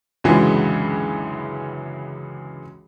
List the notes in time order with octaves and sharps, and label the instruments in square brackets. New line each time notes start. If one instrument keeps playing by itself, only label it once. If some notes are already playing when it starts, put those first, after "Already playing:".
[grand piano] C#2 F#2 D3 E3 G#3